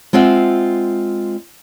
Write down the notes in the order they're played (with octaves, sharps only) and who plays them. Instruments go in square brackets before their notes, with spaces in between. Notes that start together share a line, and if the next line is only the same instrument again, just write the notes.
[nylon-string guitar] G#3 C4 F4 E5 F#5